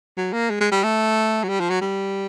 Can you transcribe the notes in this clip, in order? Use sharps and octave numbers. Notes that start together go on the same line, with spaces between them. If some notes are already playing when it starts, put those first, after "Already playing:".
F#3
A#3
G#3
G#3
G3
A3
F#3
G3
F3
F#3
G3